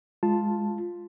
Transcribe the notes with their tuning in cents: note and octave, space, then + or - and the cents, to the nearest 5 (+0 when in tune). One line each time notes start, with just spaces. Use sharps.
G#3 +0 F4 +0 A5 +0